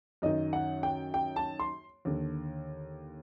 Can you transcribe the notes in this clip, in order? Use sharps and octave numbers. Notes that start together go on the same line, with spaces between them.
F#2 D#3 D#5
F#5
G5
G5
A5
C6
D#2 D3